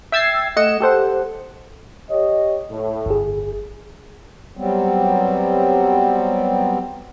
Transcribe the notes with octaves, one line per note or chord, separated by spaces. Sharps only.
E5 G5 E6 G#6 A6 C7
A3 D#5 F#5 C#7 E7
G4 A4 C5 F#5
G4 C#5 D#5
A2
G1 G#4
F#3 G3 B3 C4